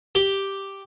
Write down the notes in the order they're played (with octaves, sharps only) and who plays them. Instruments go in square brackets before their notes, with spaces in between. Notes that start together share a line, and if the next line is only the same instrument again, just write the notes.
[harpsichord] G4